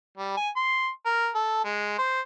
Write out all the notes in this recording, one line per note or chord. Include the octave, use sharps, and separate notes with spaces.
G3
G#5
C6
A#4
A4
G#3
C5